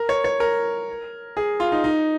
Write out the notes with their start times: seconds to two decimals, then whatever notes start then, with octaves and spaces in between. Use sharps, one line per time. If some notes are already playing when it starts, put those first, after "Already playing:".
Already playing: A#4
0.09 C#5
0.24 C#5
0.40 A#4
1.37 G#4
1.60 F4
1.72 D#4
1.84 D#4